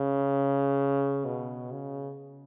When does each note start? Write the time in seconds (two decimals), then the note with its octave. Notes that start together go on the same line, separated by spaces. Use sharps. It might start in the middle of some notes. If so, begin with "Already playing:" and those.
Already playing: C#3
1.25 B2
1.72 C#3